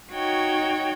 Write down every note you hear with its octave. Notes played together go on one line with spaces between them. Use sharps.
D#4 F#4 C#5 G5 G#6